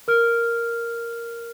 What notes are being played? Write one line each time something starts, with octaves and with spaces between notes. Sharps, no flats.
A#4 F6